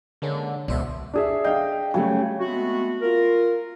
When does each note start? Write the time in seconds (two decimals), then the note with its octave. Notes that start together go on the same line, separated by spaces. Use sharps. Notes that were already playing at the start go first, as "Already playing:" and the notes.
0.22 D3 G#3 A#3 C#4
0.68 C#2 B2 D4 C5 E5
1.14 D4 G#4 E5
1.44 D#5 F5 G5
1.94 C#3 F#3 G3 A3
2.39 G#3 A3 B3 C4 F#4
3.01 F4 A#4